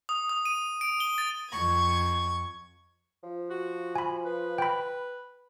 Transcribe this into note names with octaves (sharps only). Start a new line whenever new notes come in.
D#6
D#6
D#7
D7
G7
A6
F2 C#6 G#6
F3
F#4
G#5 B5
B4
G5 B5